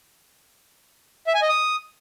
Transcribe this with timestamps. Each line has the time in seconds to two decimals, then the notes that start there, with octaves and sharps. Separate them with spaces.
1.27 E5
1.34 G#5
1.42 D#5
1.49 D#6